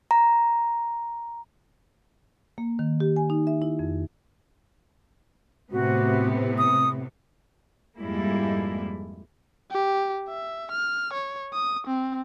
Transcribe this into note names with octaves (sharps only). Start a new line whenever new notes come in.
A#5
A#3
D#3
G4
G#5
D#4
E5
E4
F2
A2 C3 B3 F#4
D#6
F2 G#2 G3 G#3 A#3 E4
G4
E5
F6
C#5
D#6
C4